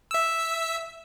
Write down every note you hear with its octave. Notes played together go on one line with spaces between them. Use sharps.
E5 E6